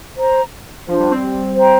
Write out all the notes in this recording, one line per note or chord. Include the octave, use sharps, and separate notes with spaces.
C5 A#5
F3 D4 F4 C5
G3
C4
C5 G5 A#5